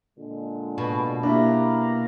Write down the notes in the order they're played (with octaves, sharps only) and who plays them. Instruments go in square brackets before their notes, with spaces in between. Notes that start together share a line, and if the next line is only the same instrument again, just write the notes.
[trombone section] A#2 D3 G#3
[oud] B2
[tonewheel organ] A#3 [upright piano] D4 E4 G4